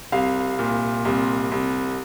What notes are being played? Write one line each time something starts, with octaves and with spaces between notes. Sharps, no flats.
C2 F5
A#2
C2
C2